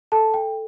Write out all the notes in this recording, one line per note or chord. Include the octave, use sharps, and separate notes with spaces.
A4 A5
G5